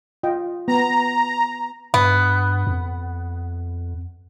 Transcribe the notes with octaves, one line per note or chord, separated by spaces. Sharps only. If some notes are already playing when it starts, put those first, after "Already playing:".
F4 D#5 G5
B3 A#5
G2 B3
F2